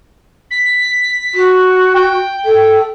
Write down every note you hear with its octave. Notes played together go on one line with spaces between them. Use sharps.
B6
F#4
G5
A4